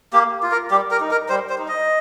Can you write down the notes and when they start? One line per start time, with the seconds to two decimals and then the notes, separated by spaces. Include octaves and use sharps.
0.13 A#3 G4
0.43 F4
0.51 A#4
0.71 G3 G4
0.91 A#4
1.00 D#4
1.11 A#4
1.29 G3 C5
1.49 C5
1.58 D#4
1.68 D#5